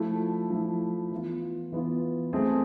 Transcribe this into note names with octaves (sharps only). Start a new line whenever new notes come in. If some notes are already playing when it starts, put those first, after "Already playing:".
Already playing: F3 A3 E4
F3 A3 E4
E3 B3 F4
E3 B3 F4
A3 C4 G#4